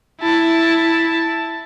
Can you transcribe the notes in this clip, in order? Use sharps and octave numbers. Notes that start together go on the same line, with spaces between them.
E4 A5